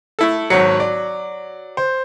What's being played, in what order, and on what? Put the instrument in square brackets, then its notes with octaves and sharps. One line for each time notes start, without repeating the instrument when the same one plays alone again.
[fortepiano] A3 E4 A4
[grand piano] G#1 C#5 C#7 [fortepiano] F#3
[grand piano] D5
C5